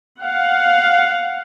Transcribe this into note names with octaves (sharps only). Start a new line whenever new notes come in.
F5 F#5